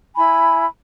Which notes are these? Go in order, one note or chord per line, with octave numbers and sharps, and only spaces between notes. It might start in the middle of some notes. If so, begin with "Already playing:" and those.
E4 G#5 B5